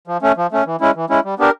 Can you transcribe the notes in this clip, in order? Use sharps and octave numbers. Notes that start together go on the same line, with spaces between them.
F3
A3 C#4
F3
A3 C#4
E3
G#3 C#4 E4
E3
G#3 C#4 E4
G3
B3 D4 G4 A#4